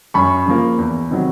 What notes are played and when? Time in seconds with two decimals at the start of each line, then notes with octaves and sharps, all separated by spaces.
0.14 F#2 B5 C#6
0.46 C#3 F3 A#3
0.78 E2
1.11 C3 D#3 F#3